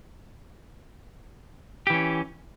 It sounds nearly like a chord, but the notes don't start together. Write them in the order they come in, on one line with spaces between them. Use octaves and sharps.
G4 E3 C#4